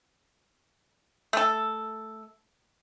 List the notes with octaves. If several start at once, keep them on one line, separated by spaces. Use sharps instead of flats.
A3 A4